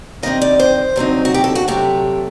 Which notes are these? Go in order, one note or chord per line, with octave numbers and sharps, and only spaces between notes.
D#3 G3 C4 D#4 D#5
D5
C5
G2 D3 F#3 C4 D#4
F#4
G4
A4
F#4
C3 F#3 A3 G4